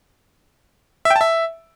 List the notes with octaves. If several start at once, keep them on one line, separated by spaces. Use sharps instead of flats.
E5
G5
A5
E5